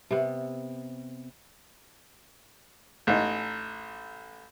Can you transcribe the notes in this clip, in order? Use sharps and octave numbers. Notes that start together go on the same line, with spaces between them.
C3 B3
A1 D#4